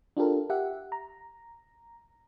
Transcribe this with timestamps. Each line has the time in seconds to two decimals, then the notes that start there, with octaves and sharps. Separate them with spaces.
0.17 D4 F4 G4 A4 A#4
0.50 G4 E5 F#5
0.92 A#5